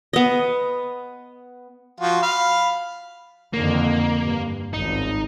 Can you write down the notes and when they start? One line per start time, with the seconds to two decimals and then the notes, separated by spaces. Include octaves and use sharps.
0.13 B3 D#5
2.00 F3 F4 F#4
2.22 F5 B5
3.53 F2 D3 D#3 A#3
4.19 G2
4.73 G#1 C#2 D#4